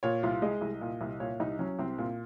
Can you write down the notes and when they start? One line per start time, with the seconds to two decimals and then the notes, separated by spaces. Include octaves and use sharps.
0.03 A#2 C#5
0.23 C2 F4
0.42 G#3 D#5
0.61 C2
0.81 A#2
1.01 C2
1.20 A#2 C#5
1.40 C2 D#4
1.59 F#3 C#4
1.79 C2 C4
1.98 A#2